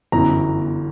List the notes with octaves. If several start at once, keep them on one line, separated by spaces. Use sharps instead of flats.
G1 F#2 E3 B3 A#5